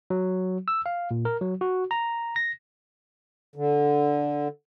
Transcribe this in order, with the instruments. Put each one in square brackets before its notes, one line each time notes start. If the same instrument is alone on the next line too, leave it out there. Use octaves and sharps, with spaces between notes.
[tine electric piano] F#3
E6
F5
A#2
A#4
F#3
F#4
A#5
A#6
[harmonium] D3